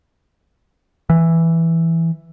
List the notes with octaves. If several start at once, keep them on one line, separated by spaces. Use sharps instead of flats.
E3